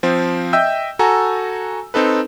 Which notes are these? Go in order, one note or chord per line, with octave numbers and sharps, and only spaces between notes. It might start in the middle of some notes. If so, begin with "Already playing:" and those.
F3 C4
D#5 E5 G5 E6 G6
F#4 A4 G#5 A#5
C4 D#4 A4 B4